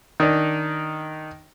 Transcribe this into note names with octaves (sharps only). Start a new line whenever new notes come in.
D#3 D4 D#4